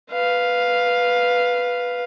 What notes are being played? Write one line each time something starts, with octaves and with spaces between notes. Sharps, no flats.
B4 F5